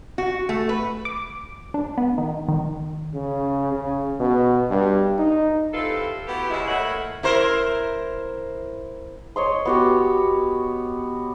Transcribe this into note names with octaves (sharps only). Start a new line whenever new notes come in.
F#4
A3
B4
D6
D4
B3
D#3
D#3
C#3
C#3
B2
G2
D#4
A2 C3 E4 F4 A4 B4
B3 E4 F#4 G4
C#3 G#3 E4
A2 A#3 B4 C#5 E5 F#5
E4 A#4 C5
C#5 D#5 C6
B3 F#4 G4